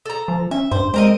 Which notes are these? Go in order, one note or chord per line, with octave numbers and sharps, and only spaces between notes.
A4 A#5
F3
C#4 E5
G2 C5
G#3 C4 A#4 D#5